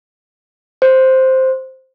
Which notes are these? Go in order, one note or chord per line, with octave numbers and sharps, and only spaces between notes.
C5